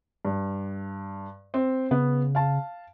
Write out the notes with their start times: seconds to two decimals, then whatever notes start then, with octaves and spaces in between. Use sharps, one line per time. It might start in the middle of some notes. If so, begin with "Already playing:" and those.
0.25 G2
1.54 C4
1.91 C#3 B3
2.35 F5 A5